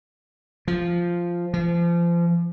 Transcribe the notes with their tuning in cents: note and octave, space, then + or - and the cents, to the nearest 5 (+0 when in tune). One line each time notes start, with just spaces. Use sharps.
F3 -5
F3 -30